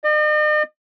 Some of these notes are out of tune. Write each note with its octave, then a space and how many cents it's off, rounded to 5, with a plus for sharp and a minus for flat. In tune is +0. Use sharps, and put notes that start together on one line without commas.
D#5 -45